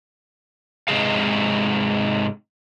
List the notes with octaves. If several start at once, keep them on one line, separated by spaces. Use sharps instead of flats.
G#2 C3 G#3 G#4 F5